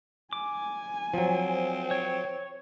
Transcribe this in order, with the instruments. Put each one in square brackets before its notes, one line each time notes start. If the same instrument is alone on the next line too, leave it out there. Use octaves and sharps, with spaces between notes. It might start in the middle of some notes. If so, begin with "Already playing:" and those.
[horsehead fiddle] G#5 [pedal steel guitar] D6
[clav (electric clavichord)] F3 F#3 [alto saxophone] C4
[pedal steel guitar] C#5